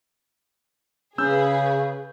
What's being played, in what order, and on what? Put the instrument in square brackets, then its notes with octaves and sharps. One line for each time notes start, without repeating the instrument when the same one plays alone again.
[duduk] C#3 [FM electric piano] C#4 [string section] G#4 B4 [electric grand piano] E6 G6